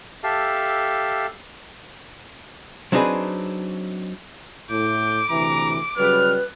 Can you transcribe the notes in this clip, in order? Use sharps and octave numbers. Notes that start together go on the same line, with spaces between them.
G4 A4 E5 F5 A5
F#3 C4 D4 D#4 G#4 B4
A2 D6 G6
D2 C3 E3 A#5
C#3 F#3 G3 B4 F6